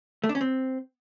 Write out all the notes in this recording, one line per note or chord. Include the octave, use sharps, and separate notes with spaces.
A3
D4
C#4
C4